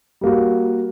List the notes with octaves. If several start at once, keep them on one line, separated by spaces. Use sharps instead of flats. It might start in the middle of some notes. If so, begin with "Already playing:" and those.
G3 A#3 F#4